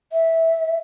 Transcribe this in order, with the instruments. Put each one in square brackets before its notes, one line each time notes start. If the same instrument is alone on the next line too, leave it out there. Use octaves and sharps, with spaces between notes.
[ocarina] E5